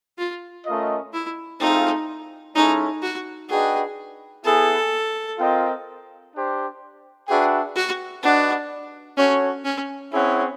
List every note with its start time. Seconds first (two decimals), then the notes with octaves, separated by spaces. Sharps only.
0.18 F4
0.65 A3 C#4 F4 A#4 D#5
1.13 E4
1.60 A3 C4 D#4 F4 G#4
2.55 G#3 C#4 D#4 E4 A4 C#5
3.02 F#4
3.49 D4 F#4 G#4 B4 D#5 G5
4.44 B3 E4 G#4 A4
5.39 C4 F4 A#4 D#5 G5
6.33 D4 G4 C5
7.28 D4 F#4 G#4 B4 E5 G5
7.76 F#4
8.23 D4 F#4 B4 D#5 F#5
9.17 C#4 F#4 A4 C#5
9.65 C#4
10.12 C4 C#4 E4 G#4 C#5 F#5